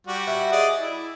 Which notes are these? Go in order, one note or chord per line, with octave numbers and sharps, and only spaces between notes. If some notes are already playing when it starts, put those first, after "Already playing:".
G3 F#4
E5 G#5
G#4 D5 D#5
E4